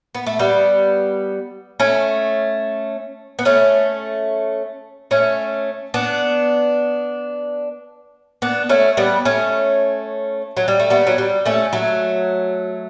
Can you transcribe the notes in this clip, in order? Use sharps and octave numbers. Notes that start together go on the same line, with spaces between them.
B3
A3
G3 B3
A3 C#4
B3
A3 C#4
A3 C#4
B3 D4
B3 D4
A3 C#4
G3 B3
A3 C#4
F#3
G3
A3
G3 B3
F#3
G3
A3 C#4
F#3 A3